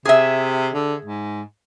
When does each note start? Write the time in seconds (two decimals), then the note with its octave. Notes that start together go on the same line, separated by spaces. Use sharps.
0.05 C3 G#4 E5
0.74 D3
1.05 G#2